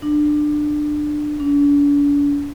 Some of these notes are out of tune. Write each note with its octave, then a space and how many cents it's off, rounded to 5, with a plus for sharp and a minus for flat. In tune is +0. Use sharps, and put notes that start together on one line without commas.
D4 +20
D4 -40